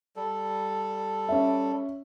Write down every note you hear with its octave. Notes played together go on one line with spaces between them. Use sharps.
G3 A4
C#4 E5